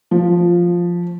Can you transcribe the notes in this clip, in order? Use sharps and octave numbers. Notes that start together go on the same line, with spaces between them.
F3